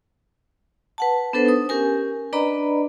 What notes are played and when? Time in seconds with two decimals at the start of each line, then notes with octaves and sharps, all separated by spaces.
0.98 B4 F#5 A5
1.33 B3 D4 A4 B4 C5
1.45 D#4 D#6
1.69 C#4 G4 A#4 G#5
2.33 D4 B4 D5 D#5 A#5 B5